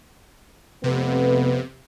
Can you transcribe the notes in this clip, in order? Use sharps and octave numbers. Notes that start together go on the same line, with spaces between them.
F2 C3 A3 B3